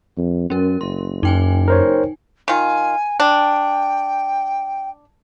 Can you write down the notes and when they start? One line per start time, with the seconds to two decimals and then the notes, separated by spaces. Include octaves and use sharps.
0.17 F2
0.50 F#2 C#4 A#4
0.81 F#1 C6
1.23 F#2 D#4 G5 G#5
1.68 A#4 C5 C#5
2.48 D#3 F4 G#5
3.20 D4 G5